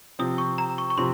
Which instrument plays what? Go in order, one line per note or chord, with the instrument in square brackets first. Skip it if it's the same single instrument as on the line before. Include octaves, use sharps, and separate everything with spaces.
[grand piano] C3 F3 C4 [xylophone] D#6
[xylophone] C#6
A#5
C#6
C#6
[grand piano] C3 F3 C4 [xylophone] C6